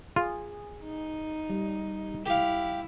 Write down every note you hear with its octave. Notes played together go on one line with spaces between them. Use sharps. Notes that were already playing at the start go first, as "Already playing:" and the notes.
F4 G#4
D#4
G3
E4 G4 F5